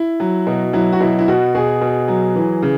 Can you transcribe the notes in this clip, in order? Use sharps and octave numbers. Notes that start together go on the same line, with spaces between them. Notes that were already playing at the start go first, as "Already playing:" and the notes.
Already playing: E4
F#3
B2
F#3 E4
F#4
B2 E4
E4
B2 F#4
B2 G#4
B2
F#3
E3
C#3